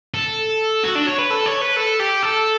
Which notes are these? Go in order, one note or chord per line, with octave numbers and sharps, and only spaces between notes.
A4
F#4
D4
C#5
B4
A4
C#5
B4
A4
G4
A4